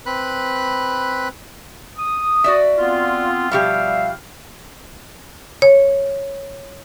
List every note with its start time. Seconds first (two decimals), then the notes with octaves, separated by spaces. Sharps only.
0.06 C4 B4 B5 F#6
1.97 D#6
2.44 F#4 D5 E5
2.77 B3 C4 F4
3.51 B2 F3 G3 G4 E5 F5
5.62 C#5